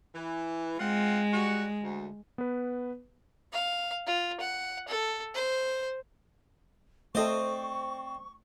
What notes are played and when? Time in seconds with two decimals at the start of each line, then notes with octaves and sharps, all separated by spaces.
0.15 E3
0.80 G#3 C4 F4 F#5
1.33 G3 F#4
1.83 D2
2.38 B3 B4
3.53 F5
4.07 F4
4.40 F#5
4.88 A4
5.34 C5
7.15 A3 C4 A4 C5 D5 D#5 C#6